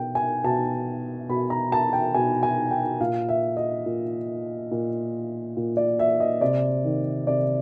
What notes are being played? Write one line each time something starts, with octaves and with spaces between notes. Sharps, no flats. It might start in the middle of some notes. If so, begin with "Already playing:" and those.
Already playing: B2 G5
G#5
B2 A5
B2 B5
A#5
A5
G5
B2 G#5
G#5
G5
A#2 F5
E5
D#5
A#2
A#2
A#2
D5
E5
D#5
C3 D5
D#3
C3 D5